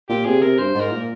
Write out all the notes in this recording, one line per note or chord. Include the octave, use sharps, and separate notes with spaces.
A#2 G4
C3 G#4
C3 A#4
G2 C5
G#2
A#4
A#2